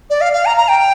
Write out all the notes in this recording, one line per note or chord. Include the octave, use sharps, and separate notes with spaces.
D5
F5
F5
A#5
A#5
G5